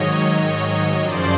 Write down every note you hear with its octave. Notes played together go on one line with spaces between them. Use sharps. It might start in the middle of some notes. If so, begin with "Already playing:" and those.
Already playing: G#2 D#3 F#3 C#5 D#5
F#2 C#3 F3 C5 D5